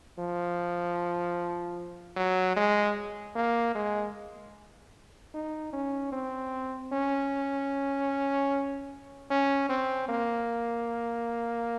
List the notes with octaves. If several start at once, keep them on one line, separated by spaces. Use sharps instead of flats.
F3
F#3
G#3
A#3
G#3
D#4
C#4
C4
C#4
C#4
C4
A#3